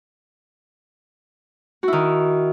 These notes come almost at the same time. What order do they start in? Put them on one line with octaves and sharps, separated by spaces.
F#4 E4 D#3